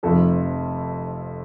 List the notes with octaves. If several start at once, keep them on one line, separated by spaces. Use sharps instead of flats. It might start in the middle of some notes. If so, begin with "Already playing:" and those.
F1 F2 F3 A4